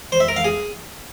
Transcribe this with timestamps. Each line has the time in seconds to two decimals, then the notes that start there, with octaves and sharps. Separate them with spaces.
0.12 C5
0.20 E5
0.28 A#4
0.36 F5
0.44 G#4